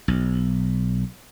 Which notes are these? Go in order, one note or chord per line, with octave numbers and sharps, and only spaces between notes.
B1